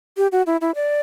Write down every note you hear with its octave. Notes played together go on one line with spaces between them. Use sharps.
G4
F#4
E4
E4
D5